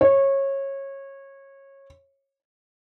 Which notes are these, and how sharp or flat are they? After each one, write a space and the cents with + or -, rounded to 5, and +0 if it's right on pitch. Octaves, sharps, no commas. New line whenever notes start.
C#5 -20